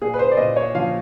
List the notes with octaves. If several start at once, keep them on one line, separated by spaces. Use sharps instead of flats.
A#2 G#4
B4
C5
D5
A#2 D#5
C#5
F3 F5